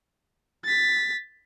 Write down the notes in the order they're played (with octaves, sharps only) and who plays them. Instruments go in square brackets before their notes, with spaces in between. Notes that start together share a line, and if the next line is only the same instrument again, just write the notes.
[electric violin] A6 B6